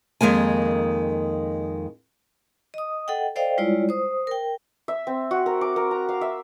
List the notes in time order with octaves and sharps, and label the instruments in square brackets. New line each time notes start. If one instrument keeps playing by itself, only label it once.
[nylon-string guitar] F2 D#3 G#3 A#3 G#5
[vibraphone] D#5 D#6
A4 D#5 F#5 G5
A4 C5 D5 D#5 F5 G5
G3 G#3 E4 F4 C#5 D5
C5 D#6
A#4 G5
[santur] E5
C4
F#4
A#4
D6
A#4
A#5
F5
E5